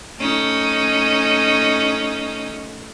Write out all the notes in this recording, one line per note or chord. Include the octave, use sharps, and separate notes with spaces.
A3 C#4 D#4